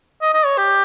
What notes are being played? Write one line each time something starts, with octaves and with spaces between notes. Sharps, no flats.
D#5
D#5
C#5
G4